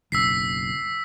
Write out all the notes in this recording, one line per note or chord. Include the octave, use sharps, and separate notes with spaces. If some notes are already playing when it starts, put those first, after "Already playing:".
F#1 B1 E6 B6 C7